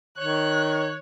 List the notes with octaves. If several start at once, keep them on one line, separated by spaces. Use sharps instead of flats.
D#3 C#5 F#6